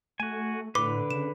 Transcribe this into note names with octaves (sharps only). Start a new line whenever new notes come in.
A3 F#4 G#5
A2 D3 B4 D6
C#3 E7